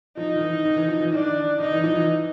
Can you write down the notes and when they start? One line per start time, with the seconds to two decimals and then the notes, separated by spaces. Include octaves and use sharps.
0.17 F3 D#4
0.36 D#3
0.41 E3
0.65 D#3
0.76 E3
0.88 F3
1.01 E3
1.12 D#3 D4
1.60 D#3 D#4
1.72 E3
1.84 F3
1.95 E3